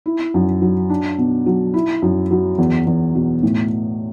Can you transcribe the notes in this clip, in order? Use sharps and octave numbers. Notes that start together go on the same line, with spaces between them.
E4
F#2
F#3
D4
B2
F#3
E4
F#2
F#3
E2
E2
B2
A2